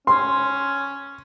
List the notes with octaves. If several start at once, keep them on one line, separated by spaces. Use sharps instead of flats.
C#4 C6